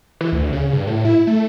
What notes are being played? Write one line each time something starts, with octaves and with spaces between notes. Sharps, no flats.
E3
D2
C#3
G2
A2
E4
A3